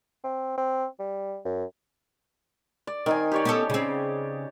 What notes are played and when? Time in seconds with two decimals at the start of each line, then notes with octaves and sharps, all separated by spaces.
0.24 C4
0.58 C4
1.00 G3
1.45 F#2
2.87 D5
3.06 D#3 C4 D#4 G#5
3.32 G4 C#5 D5
3.45 B3 C#4 A4
3.70 C#3 C4